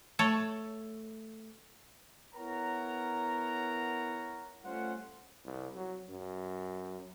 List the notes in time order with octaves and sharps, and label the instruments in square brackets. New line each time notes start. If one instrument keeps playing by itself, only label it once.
[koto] A3 A4 C#5
[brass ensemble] B3 E4 A#4 C#5 F#5 A#5
G3 A3 C#4 F4 C5 F#5
[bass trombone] C2
F#3
F#2